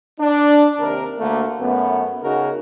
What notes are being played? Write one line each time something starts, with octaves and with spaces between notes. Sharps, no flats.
D4
D#2 C3 A#4
D2 A3 A#3
F#2 A3 B3
C#3 D#4 F#4 G#4 A#4